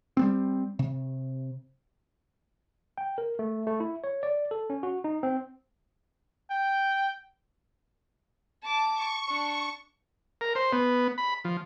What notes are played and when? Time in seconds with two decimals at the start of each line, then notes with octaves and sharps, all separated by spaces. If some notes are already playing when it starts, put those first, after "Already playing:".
0.17 G3 B3 C4
0.79 C3
2.98 G5
3.18 A#4
3.39 A3
3.67 A3
3.80 E4
4.04 C#5
4.23 D5
4.51 A4
4.70 C#4
4.83 F#4
5.04 D#4
5.23 C4
6.51 G5
8.63 A5 D6
8.94 C#6
9.28 D4
10.41 A#4
10.55 C5
10.73 B3
11.18 B5
11.44 F3